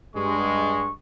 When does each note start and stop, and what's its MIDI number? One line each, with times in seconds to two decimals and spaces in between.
0.16 0.89 43
0.16 0.89 56
0.16 0.92 85